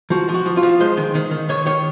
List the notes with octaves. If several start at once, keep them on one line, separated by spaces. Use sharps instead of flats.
F3 F#4
F3
F#4
F3
F4
F3
G#3 C5
D#3
D#3
D#3
D#3 C#5
D#3 C#5